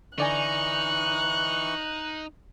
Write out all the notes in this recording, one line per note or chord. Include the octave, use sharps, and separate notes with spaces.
D3 E3 D#4 D5 G#5 C#6 F#6